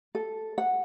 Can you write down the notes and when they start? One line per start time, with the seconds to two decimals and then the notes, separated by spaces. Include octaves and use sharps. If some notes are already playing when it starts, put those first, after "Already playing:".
0.15 A4
0.58 F#5